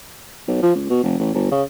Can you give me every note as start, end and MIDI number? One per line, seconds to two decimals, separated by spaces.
0.48 0.61 35
0.63 0.73 53
0.75 0.87 37
0.90 0.99 47
1.03 1.16 29
1.19 1.31 33
1.34 1.50 31
1.52 1.63 49